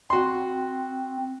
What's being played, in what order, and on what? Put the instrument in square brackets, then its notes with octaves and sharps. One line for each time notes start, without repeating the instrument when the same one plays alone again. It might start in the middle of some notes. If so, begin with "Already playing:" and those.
[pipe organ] C4 [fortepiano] F#4 C6